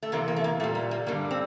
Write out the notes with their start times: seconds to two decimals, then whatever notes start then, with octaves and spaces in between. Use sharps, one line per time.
0.03 A3
0.12 E2 C3 E3 A#3
0.28 A#3
0.36 A3
0.44 A#3
0.60 A#2 A3
0.64 G3
0.75 A#3
0.91 A#3
1.07 G2 D3 G3 A#3
1.31 C4